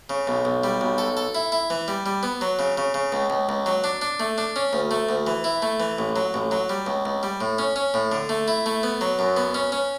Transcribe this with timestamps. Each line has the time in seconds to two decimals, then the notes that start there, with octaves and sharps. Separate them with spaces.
0.10 C#3
0.27 B1
0.45 B1
0.64 G3
0.81 B1
0.98 A4
1.17 A4
1.35 E4
1.52 E4
1.70 E3
1.88 G3
2.06 G3
2.23 B3
2.41 F#3
2.59 C#3
2.78 C#3
2.94 C#3
3.12 C#2
3.30 C#2
3.49 C#2
3.66 F#3
3.84 D4
4.01 D4
4.20 A3
4.38 D4
4.56 C#4
4.73 D2
4.91 A3
5.09 D2
5.27 E3
5.44 E4
5.62 A3
5.80 E3
5.99 A1
6.16 F#3
6.34 A1
6.51 F#3
6.69 G3
6.86 C#2
7.05 C#2
7.23 G3
7.41 A2
7.58 C#4
7.76 C#4
7.94 A2
8.12 D3
8.29 A3
8.48 E4
8.66 A3
8.83 B3
9.01 F#3
9.19 F#2
9.37 B3
9.54 C#4
9.72 C#4